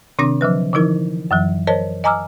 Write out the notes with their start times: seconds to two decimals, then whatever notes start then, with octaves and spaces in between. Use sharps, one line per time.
0.19 C3 D#3 C4 D4 D6 A#6
0.41 D3 F3 F#3 B4
0.73 D3 E3 F3 D#4 E4 A#4
1.31 F#2 E3 F#3
1.67 A#4 C5 C#5 D#5 A5
2.04 D#5 G#5 A#5 D6 E6 F6